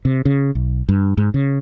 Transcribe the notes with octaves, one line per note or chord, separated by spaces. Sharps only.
C3
C#3
B1
G2
G#2
C#3